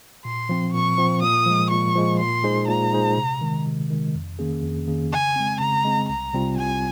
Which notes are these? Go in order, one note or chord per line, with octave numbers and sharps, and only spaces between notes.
A#2 C6
F3 C4
A#2 C#6
F3 C4
A#2 D#6
F3 G#3
A#2 C#6
F3 G#3
A#2 C6
G#3 D#4 G#4 C5
A#2 A#5
G#3 D#4 G#4 C5
C3
D#3 G#3
C3
D#3 G#3
F2
D#3 A#3 C#4 G#4
F2
D#3 A#3 C#4 G#4
C#3 G#5
G#3 C4
C#3 A#5
G#3 C4
C2 A#5
C3 G3 C4 F4
C2 G#5